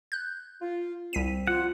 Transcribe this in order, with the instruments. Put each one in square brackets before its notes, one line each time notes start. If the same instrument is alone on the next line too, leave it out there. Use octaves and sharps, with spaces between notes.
[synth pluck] F#6 G6
[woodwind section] F4
[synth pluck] C2 B6 D#7 [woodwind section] C4
[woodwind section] F3 G3 G4 [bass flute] F4 [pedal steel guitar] F#5